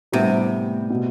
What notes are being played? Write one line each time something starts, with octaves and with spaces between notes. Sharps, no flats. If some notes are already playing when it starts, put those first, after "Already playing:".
A2 C3 G3 B3 D4
B2